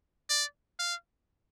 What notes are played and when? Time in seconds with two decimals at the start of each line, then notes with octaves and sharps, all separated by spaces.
0.29 D5
0.79 F5